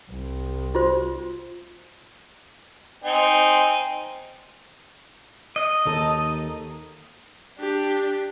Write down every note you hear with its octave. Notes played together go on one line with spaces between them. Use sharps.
C2
F4 F#4 C5
C4 D#4 G#5
D#5
D#2 D#4 A4
D4 G4